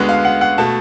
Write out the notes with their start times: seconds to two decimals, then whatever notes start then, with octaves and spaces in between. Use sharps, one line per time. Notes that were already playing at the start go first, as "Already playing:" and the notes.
Already playing: D2 D3 G#3 B3
0.09 F5
0.25 F#5
0.41 F#5
0.58 B2 A3 A5